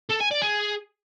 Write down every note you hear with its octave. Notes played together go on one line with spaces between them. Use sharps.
A4
G#5
D5
G#4